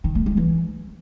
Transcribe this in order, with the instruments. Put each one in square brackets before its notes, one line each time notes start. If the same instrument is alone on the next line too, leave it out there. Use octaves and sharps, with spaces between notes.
[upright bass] D#3
A3
G#3
E3